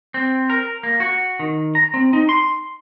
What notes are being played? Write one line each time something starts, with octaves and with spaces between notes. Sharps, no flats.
C4
A#4
A#3
F#4
D#3
A#5
C4
D#4
C6